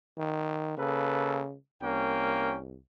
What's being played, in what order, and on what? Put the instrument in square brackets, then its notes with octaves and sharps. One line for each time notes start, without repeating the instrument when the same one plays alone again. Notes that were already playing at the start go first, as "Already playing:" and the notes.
[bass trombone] D#3
[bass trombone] C#3 [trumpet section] A#3 A4 B4
[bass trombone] C2 [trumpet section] A#3 C#4 G5